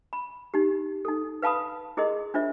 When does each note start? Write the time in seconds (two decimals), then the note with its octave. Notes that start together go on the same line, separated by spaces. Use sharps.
0.13 B5
0.54 D#4 G4
1.05 D#4 A4
1.42 B4 F5 A5 B5 D#6
1.97 E4 G#4 A#4 D#5 C6
2.34 D4 F4 C5 E5